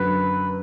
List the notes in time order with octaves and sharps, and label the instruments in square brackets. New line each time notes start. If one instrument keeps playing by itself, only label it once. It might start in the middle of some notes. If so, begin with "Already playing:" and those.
Already playing: [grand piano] F#2 D3 F#3 [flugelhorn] B4